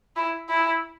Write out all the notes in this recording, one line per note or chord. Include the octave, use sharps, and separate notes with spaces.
E4
E4